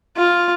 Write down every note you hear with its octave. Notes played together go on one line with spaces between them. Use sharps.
F4